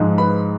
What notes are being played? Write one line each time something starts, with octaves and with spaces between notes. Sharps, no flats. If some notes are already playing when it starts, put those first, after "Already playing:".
Already playing: G#2 F3 G#3
B4 B5